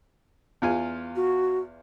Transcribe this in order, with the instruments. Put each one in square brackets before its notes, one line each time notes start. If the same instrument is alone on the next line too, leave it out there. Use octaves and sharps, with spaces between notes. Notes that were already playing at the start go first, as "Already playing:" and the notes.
[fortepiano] E2 F4 G#5
[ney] F#4